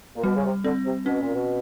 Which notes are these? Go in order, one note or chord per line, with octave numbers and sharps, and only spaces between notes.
A#2
B2 G3
C#3
C3
D3 C4
C3
B2 C#4
A#2
B2